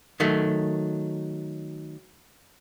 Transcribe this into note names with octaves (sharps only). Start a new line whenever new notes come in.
D#3 F#3 A3